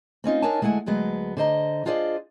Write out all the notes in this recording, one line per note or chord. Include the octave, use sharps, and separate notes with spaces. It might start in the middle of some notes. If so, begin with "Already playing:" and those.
C4 C#4 D#4 F4
D4 D#4 A#4 C#5 G#5 A5
D2 G#3 A3 E4 F#5 G#5
D2 F#3 G#3 B3
D3 C5 D#5 A#5
D4 F4 G#4 C5 D5 D#5